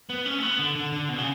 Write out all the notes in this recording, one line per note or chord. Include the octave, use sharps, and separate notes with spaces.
B3
C#4
A3
B3
D3
D3
D3
B2
C#3